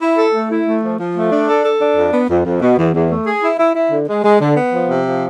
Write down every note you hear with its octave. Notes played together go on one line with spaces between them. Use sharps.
E4
A4
A3
E4
A3
F3
F3
A3
D4
A4
A4
D4
F2
B3
F2
F2
B2
E2
E2
A3
G#4
E4
E4
E4
D3
G#3
G#3
D3
B3
F3
C3
F3